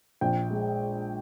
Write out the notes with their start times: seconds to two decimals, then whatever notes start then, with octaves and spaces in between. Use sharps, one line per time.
0.21 A#1 G5
0.51 G#3